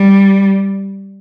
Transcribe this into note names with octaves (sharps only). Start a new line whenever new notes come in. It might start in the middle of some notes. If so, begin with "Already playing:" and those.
Already playing: G3